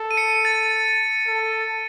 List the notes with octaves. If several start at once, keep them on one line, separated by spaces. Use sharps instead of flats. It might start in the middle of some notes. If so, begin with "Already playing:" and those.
Already playing: A4
D#7
C#7
A6
A4